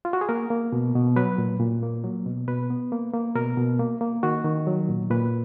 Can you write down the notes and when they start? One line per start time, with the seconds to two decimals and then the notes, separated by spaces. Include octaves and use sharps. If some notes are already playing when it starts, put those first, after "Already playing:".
0.05 F4
0.13 F#4
0.21 G#4
0.29 A#3 A#4
0.50 A#3
0.72 B2
0.95 B2
1.16 F#3 B4
1.38 A#2
1.60 A#2
1.83 A#3
2.04 F#3
2.26 B2
2.48 B2 B4
2.70 B3
2.92 A#3
3.13 A#3
3.35 B2 A#4
3.57 B2
3.79 A#3
4.01 A#3
4.23 D#3 F#4
4.45 D#3
4.67 F#3
4.89 A#2
5.10 A#2 B4